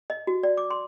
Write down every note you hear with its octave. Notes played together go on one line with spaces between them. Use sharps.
D#5
F#4
D5
D6
C6